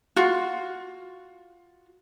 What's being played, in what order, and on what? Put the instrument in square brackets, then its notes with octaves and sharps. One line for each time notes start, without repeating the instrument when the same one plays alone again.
[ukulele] F4 F#4